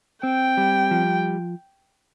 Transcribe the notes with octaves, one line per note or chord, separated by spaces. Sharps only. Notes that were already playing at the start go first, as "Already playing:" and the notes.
C4 G5
G3
F3